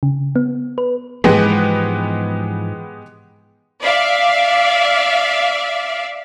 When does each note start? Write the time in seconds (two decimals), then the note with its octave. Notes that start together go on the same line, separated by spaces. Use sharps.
0.03 C#3
0.36 B3
0.78 B4
1.24 G#2 E3 F3 G#3 B3 G4
3.82 D5 E5 F5